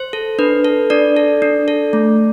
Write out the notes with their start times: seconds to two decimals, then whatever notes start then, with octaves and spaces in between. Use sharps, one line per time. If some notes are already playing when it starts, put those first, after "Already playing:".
Already playing: C5
0.13 A4
0.39 D4 B4
0.65 A4
0.90 D4 D5
1.17 A4
1.42 D4
1.68 A4
1.93 A3